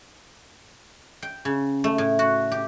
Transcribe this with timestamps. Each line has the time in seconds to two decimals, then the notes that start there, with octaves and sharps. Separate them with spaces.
1.22 G5
1.45 C#3
1.84 A3
1.98 A2
2.19 F#4
2.52 G4